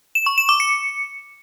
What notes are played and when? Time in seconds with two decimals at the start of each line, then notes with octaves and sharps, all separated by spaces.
0.15 E7
0.26 C#6
0.38 E7
0.49 D6
0.60 C#7